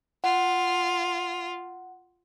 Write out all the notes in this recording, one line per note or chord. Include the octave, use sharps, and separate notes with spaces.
F4 F#5